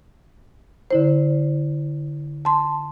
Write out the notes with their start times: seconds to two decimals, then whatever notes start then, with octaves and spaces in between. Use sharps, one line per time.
0.91 D3 E4 C5
2.45 A5 C6